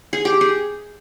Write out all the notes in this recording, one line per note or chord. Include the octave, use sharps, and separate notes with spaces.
G#4
G4
G#4